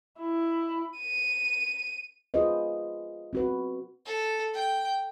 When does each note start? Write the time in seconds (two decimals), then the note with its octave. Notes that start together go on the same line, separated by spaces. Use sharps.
0.20 E4
0.99 D#7
2.34 F4 G#4 B4 C5 D#5
3.33 C4 F#4 B4
4.06 A4
4.54 G5